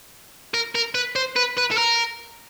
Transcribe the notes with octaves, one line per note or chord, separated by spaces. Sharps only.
A#4
A#4
B4
C5
B4
B4
A4
A#4